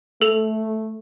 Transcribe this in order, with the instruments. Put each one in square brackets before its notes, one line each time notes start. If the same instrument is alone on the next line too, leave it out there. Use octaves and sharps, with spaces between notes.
[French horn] A3 [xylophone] A4 F7